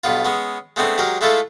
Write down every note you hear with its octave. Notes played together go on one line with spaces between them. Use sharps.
B1 G2 B3 F4
G#3 B3 C#4
G#3 A3 B3 C4 D4
F#3 G#3 G4 A#4
G#3 A3 E4 F4 A4